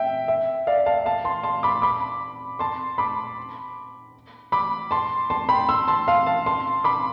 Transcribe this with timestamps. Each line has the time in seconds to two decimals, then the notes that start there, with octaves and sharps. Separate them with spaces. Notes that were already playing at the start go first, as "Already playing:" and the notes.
Already playing: E5 G5
0.28 E5
0.67 D5 F5
0.86 F5 A5
1.06 F5 A5
1.24 A5 C6
1.43 A5 C6
1.63 B5 D6
1.82 B5 D6
2.59 A5 C6
2.98 B5 D6
4.52 B5 D6
4.91 A5 C6
5.30 A5 C6
5.49 G5 B5
5.69 C6 E6
5.88 A5 C6
6.07 F5 A5
6.26 F5 A5
6.46 A5 C6
6.84 B5 D6